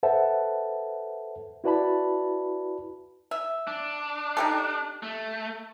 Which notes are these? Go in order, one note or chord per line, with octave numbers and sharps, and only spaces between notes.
A4 B4 C5 E5 F#5 A5
E4 F#4 B4 D5 A5 B5
E5
D4
D#4 G4 A4
A3